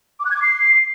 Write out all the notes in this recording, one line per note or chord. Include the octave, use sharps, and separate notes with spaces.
D6
F#6
G#6
D6
C7